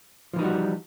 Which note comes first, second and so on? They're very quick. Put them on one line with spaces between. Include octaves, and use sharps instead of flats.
F3 E3 D#4 G3 F#4